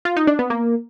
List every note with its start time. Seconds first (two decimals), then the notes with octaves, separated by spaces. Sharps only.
0.05 F4
0.17 D#4
0.27 D4
0.39 B3
0.50 A#3